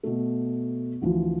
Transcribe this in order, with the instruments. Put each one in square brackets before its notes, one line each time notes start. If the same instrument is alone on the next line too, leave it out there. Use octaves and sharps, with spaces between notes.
[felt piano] B2 A3
D2 E3 F3